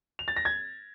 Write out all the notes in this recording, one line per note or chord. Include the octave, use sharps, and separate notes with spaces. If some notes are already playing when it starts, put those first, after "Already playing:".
F7
A6
A#6
G#6